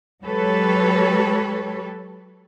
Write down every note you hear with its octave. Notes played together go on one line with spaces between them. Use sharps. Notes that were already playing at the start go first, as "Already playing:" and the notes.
F#3 G#3 G4 A4 B4 C#5